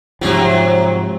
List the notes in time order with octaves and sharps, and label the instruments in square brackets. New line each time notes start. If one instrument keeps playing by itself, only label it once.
[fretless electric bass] G#2 F3 [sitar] C3 F#3